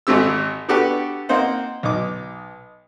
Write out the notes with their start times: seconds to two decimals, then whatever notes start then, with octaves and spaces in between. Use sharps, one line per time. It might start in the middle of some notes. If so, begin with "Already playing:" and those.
0.07 G#1 A3 C4 G4 E6
0.68 B3 D4 F#4 G4 A4 B4
1.29 A#3 C4 D#4 C5 F#5
1.83 B1 D#4 D6